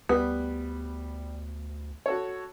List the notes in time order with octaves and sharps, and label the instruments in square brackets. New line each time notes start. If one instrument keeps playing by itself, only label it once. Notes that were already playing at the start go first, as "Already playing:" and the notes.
[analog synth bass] D2 [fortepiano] G3 [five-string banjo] B3
[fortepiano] F#4 A4 C#5